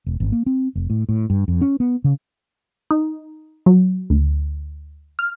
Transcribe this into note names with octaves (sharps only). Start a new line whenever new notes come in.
E1
G#1
A#3
C4
F1
A2
A2
G2
F2
C#4
B3
C#3
D#4
F#3
D2
F6